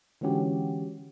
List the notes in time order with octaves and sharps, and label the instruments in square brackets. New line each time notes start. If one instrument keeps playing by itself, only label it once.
[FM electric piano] D3 E3 G#3 C#4 F#4 G4